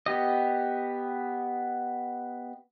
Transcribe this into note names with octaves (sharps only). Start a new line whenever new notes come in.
B3 G4 D#5